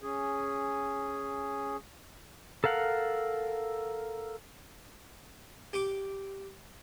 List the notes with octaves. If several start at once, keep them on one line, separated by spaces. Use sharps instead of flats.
C#4 G#4
A4 A#4 F5 F#5
G4 D6